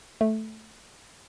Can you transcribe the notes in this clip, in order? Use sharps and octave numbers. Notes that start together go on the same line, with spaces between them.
A3